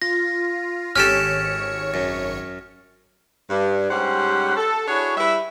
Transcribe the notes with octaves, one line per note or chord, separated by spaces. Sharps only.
F4 A#6
G#1 C#4 G4 A4 C#5 F6 C#7 E7
F#2
G2
G#2 G3 C#4 G4 C5 F#5
A4
D4 E4 F#4 G#4 C#5
G3 E4 B4 E5